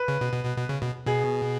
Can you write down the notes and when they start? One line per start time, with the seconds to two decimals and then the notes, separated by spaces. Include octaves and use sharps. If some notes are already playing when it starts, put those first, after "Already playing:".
Already playing: B4
0.08 C#3
0.21 B2
0.33 B2
0.45 B2
0.57 B2
0.69 C#3
0.82 B2
1.06 B2 G#4